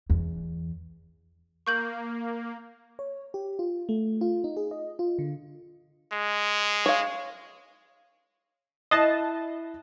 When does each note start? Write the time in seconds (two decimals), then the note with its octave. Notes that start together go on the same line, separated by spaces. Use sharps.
0.10 E2
1.67 A#3 C#6 G6 F#7
2.99 C#5
3.34 G4
3.59 F4
3.89 A3
4.21 F4
4.44 D#4
4.57 G#4
4.71 D#5
4.99 F4
5.19 D3
6.12 G#3
6.86 C#5 F5
8.91 E4 D#5 A5 F#6 C7